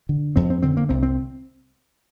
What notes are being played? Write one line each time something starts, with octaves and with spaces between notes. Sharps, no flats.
D3
F2 C4
C4
D3 C4
A#3
C2 C4
C4